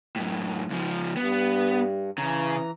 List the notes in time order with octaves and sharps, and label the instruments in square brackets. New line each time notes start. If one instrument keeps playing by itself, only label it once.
[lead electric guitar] F#2 A2
C#2 F3
[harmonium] G2 [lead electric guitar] B3
[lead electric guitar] C#3 [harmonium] E3 A#5